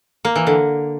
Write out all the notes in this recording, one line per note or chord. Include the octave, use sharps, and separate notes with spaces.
A#3
E3
D3